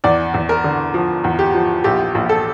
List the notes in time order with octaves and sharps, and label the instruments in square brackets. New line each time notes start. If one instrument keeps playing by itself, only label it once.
[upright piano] E2 D5
E2
A#4
D3
F3
E2
G4
F3
A#1 G4
A#1
A4